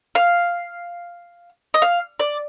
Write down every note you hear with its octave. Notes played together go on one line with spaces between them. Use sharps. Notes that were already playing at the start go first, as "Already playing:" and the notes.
F5
D#5
F5
D5